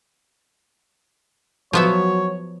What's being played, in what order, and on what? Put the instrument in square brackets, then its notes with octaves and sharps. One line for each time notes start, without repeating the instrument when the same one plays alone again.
[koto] F3 B3 E5 [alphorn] F#3 [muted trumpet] C#5